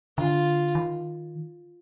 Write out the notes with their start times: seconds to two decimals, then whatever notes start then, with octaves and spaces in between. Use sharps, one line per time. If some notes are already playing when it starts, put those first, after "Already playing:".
0.18 D3 F4
0.75 D#3